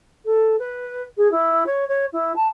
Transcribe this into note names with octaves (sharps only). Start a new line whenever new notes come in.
A4
B4
G#4
E4
C#5
C#5
E4
A5